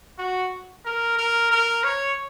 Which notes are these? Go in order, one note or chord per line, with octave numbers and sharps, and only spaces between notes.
F#4
A#4
A#4
A#4
C#5